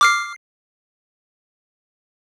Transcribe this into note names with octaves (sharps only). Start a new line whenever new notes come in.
D6 F6 C7